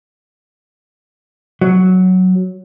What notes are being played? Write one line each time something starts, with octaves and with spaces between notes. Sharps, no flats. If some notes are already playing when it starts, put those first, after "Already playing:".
F#3